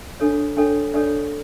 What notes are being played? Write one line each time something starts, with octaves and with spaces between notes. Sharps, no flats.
D4 A4 C#5
D4 A4 C#5 G5
D4 A4 C#5 D5